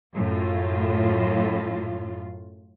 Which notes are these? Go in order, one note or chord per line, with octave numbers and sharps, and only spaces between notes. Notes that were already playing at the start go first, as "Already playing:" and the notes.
F#2 A2 F4